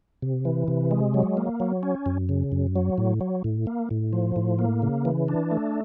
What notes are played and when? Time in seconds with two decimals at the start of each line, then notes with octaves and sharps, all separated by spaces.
0.22 C3
0.45 E3
0.68 C3
0.91 G#3
1.14 F#3
1.37 A#3
1.60 F#3
1.83 C#4
2.06 F#2
2.29 C#3
2.52 F#2
2.76 F#3
2.98 A2
3.21 F#3
3.44 A2
3.67 A#3
3.91 A2
4.13 F3
4.36 A2
4.59 A#3
4.82 C#3
5.05 E3
5.28 D4
5.51 A3